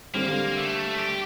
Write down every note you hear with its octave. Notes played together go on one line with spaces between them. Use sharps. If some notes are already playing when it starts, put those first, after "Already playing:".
D3 G3 A#3 C4
A3
G4